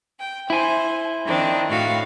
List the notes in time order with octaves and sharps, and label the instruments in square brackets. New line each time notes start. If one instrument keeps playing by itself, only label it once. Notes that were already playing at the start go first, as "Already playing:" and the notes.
[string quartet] G5
[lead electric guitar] E4 G#5 [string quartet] C5
[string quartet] D#3 C4 D4
A2 F#4 F5